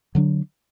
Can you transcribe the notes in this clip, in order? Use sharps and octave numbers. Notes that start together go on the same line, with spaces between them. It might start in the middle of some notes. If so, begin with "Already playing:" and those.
D3 F#3 D4